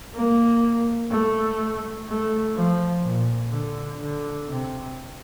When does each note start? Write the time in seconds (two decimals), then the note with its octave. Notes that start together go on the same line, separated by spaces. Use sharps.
0.15 A#3
1.11 A3
2.08 A3
2.55 F3
3.03 A#2
3.52 D3
3.99 D3
4.48 C3